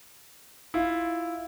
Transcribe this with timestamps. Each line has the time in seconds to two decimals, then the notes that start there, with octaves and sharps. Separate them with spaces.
0.74 E4 F4